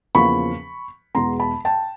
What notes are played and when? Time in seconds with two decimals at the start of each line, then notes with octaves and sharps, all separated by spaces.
0.15 E2 C#3 F3 A#3 B5 C#6
1.15 E2 B2 G#3 B3 A#5 C6
1.40 A5 B5
1.65 G5 A5